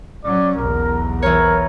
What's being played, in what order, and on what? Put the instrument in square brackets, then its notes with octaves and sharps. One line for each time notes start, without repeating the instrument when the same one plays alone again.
[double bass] F#3 C#4 [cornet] D5
[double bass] B1 E2 [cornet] A#4
[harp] E3 C#5 [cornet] A#4